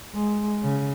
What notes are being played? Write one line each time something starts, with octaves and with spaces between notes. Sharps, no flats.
G#3
C#3